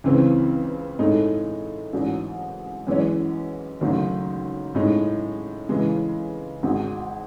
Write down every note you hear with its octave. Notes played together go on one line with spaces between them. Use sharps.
C#2 C#3 E3 C4
A2 G#3 D#4 A4
A1 G#2 F#3 C#4
F#2 E3 G#3 C#4
F#1 F#2 D#3 F#3 A3
A2 G#3 D#4
C#3 E3 G#3
G#1 G#2 D#3 G#3